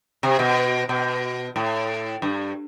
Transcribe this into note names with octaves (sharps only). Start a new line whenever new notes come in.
C3
B2
B2
A2
G2